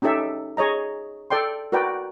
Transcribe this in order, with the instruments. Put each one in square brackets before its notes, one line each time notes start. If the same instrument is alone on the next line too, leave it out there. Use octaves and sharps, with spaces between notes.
[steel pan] C#4 D#4 G4 A4 E5
G#4 C#5 D#5 A#5
A4 D5 G5 C6
F#4 A#4 B4 D5 G5